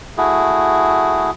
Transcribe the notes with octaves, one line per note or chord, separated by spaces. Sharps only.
A3 E4 F#4 G#4